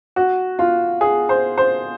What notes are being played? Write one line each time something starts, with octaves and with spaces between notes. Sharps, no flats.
F#4
F4
G#4
C5
C5